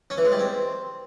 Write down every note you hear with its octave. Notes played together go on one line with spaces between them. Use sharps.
C#4
E3
G#3
G3
C4